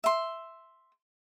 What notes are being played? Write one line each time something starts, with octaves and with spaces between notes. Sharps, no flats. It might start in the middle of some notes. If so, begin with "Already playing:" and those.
E5 C6